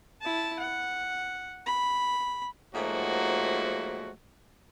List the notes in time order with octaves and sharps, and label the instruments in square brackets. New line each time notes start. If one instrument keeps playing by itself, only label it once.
[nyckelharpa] E4 A5
F#5
B5
[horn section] G#2 F3 F#3 A3 A#3 F#4